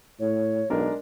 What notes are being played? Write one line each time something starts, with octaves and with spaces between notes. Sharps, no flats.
A2 C#5
B1 G#3 D4 A#4